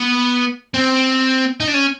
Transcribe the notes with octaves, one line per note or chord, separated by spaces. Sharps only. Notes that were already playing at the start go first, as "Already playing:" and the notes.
Already playing: B3
C4
D#4
D4
C#4